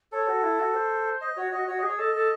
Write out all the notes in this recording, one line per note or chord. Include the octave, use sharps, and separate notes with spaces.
A4 C#5
F#4
E4
F#4
C5
D#5
F#4 C#5
F#4 D#5
F#4 C#5
D#5
G#4
C#5
A4 D#5
A4